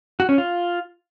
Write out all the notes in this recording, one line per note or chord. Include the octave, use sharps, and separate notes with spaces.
F#4
C#4
F4